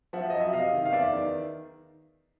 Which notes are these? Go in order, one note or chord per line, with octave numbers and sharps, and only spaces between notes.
F3 E5 F#5
F#2 D#5
E5
C3 D#5 F5
D#3
F5
E2 D5 E5
D#3